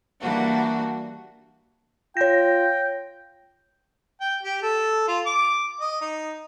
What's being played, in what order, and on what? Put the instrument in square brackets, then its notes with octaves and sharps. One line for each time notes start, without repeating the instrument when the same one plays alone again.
[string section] E3 G3 A#3 D4 F#4
[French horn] F4 [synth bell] C#5 A#6 [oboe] G5
[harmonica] G5
G4
A4
F4
D6
D#5
D#4